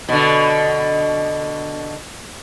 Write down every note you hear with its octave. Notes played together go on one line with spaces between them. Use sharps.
B2 D3